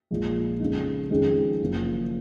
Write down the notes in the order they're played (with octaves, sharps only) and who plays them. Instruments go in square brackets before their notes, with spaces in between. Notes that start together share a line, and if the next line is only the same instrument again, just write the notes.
[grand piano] A#1 A#2 F3 G#3
F2 C#3 G#3 D#4
F2 D#3 G#3 C#4 G#4
F#1 F#2 F3